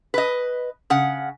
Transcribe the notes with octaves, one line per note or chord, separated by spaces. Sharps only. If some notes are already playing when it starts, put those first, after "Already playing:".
B4 D#5
C#3 F#5